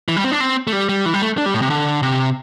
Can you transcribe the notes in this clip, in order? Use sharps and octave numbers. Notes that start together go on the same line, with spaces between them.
E3
G3
C4
D4
C4
A3
G3
G3
E3
G3
A3
D4
G3
A2
C3
D3
C3